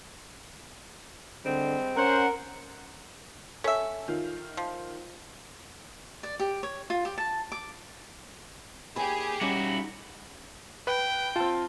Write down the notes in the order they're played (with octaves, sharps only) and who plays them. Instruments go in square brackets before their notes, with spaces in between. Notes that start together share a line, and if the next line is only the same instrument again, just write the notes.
[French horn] D3 [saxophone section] G3 G#3 C4
[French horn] C#4 [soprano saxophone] A#4 [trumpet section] C5 F#5
[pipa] C#4 E5 [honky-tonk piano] A4
[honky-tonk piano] D#3 F4
[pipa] F3
[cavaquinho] D5
G4
C#5
F4
G4
A5
D6
[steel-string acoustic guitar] D#2 G#5 [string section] G4 G#4 [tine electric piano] B5
[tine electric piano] G3 C#4 [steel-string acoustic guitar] D#4 [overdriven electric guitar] E4 F#4
[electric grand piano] B4 [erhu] G5
[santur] C4 A5 [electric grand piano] F4